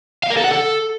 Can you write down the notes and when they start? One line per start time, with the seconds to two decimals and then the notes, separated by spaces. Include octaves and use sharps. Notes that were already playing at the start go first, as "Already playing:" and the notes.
0.23 F5
0.30 A#4
0.37 A4
0.44 F#5
0.51 A4